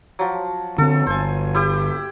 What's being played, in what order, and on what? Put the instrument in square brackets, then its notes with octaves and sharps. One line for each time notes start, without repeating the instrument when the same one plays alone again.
[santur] F3 F#3
[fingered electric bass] D3 C4 [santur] A4
[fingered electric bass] G1 [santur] C5 G#5
[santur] E4 G4 G5